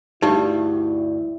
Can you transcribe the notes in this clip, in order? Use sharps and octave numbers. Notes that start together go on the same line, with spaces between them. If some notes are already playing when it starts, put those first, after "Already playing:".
D2 G2 G3 D#4 E4 G4